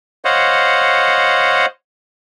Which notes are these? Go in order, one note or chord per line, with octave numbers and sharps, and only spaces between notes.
C5 C#5 D#5 F5 F#5